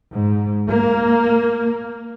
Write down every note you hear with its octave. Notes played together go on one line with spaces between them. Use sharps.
G#2
A#3